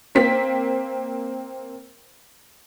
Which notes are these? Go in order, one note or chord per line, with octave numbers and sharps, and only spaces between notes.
A#3 C4 B6